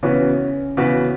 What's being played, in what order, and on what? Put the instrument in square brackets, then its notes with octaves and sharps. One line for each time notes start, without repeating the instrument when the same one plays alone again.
[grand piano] C#3 E3 B3 F#4 B4 [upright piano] C#4
[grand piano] C#3 E3 B3 F#4 B4